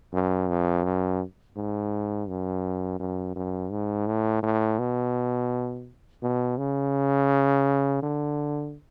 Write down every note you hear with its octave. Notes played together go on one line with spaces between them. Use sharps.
F#2
F2
F#2
G#2
F#2
F#2
F#2
G#2
A2
A2
B2
B2
C#3
D3